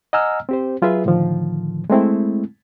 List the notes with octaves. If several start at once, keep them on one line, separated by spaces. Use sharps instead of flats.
D#5 F#5 G#5 A#5 E6 F6
C4 G4 C5
F#3 F4 G#4 B4 E5
A2 D3 D#3 F3
G#3 A3 C4 E4